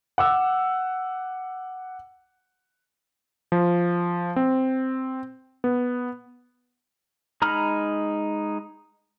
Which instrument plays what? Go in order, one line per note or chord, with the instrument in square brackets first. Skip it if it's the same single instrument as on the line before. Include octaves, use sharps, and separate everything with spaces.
[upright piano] F#5 D6 E6
[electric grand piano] F3
C4
B3
[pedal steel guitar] G#3 D#4 A#5 B5 F6